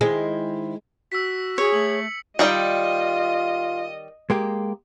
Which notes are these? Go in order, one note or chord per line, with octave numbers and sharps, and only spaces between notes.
D#3 G#3 E4 C5
F#4 E6 B6
G#4 C#5 C#7
A3 F#7
D#3 G3 F4 D#5 G5
G#3 A#3 G4